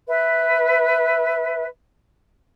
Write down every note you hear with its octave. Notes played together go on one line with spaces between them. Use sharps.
B4 E5